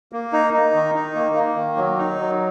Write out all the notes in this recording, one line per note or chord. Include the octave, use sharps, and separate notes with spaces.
A#3
D#4
D#4
D#3
D#4
A#3
A#3
D#3
F#3
D#4
F#3